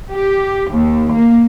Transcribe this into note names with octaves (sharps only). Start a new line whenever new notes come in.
G4
D#2
A#3